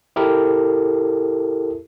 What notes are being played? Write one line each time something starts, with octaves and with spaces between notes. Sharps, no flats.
E4 G4 A4 A#4